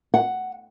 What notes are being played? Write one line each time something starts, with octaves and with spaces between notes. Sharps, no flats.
F#5